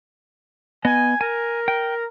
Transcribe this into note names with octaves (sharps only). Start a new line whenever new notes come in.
B3 D#5 G#5
A#4 G#5
G5